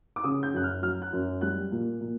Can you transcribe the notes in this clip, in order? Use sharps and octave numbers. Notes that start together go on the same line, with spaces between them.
D6
C#3 D#6
G6
F#2 F#6
F6
F#3 F6
F#6
F#2
G3 F#6
A#2
A#2